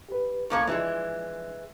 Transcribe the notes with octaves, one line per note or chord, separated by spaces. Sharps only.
G4 B4
C2 A2 A#3 A4 C#5 C#6
E3 F3 G3 G#3 D4